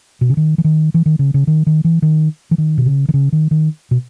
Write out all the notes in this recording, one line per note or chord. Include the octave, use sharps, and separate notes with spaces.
B2
C#3
D#3
E3
D#3
E3
D#3
C#3
C#3
D#3
D#3
E3
D#3
E3
D#3
B2
C#3
D#3
C#3
D#3
D#3
B2